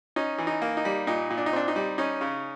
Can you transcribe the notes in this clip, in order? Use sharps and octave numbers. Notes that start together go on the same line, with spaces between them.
C#4 D#4
E3
D#4
A#3
D#4
G3
A#2 D#4
A#2
D4
D#4
C4 D4
D#4
G3
C#4 D#4
C#3